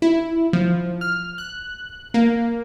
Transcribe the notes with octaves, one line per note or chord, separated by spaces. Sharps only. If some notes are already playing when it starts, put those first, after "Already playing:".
E4
F3
F6
F#6
A#3